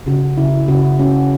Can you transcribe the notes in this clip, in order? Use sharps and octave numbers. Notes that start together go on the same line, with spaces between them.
C#3 F#4
C#3 E4
C#3 F#4
C#4 F#4